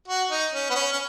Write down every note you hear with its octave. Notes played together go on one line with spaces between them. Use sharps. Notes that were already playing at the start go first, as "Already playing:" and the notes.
F#4
D#4
C#4
B3
C#4
C#4